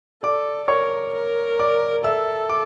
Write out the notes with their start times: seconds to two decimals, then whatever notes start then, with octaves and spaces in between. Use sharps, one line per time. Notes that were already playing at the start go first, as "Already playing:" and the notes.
0.23 A4 D5 D6
0.68 A#4 C#5 C#6
1.14 A#4
1.59 D5 D6
2.04 A4 E5 E6
2.50 D6